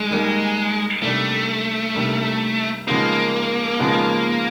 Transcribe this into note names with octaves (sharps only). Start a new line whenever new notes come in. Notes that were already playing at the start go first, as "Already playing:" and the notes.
Already playing: D#3 G3 G#3
D#3 G3 A#3 D#4
C3 D#3 G3 A3 A#3 D4
C3 D#3 G3 A#3 D4
C#3 F3 G#3 A#3 B3 D#4
C#3 F3 G#3 B3 D#4